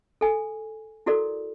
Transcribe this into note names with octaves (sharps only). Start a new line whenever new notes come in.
A4 G#5
E4 F#4 A4 A#4 D5